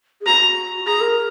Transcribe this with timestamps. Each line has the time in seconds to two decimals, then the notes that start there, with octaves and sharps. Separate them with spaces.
0.21 G#4
0.26 F#4 A#5
0.86 G#4 A#5
1.01 A#4